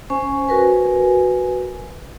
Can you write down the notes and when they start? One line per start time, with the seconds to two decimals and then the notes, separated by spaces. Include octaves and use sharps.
0.10 C#4 C5 G#5 C#6
0.47 F#4 A#4 B4 G#5